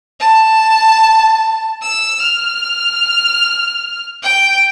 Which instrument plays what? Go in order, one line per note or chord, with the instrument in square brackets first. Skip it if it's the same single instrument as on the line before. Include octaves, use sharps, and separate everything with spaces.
[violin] A5
E6
F6
G5